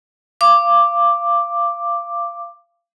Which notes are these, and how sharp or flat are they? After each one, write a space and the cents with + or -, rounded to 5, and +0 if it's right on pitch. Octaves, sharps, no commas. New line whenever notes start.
F5 -25 D6 +5